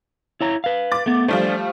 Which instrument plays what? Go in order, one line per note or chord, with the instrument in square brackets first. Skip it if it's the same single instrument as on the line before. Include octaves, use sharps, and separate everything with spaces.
[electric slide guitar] E4 C#5 A#5
B4 F5
[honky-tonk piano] D6 A6
[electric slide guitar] A3 B3
[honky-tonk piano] F3 G3 A3 [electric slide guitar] D4 C5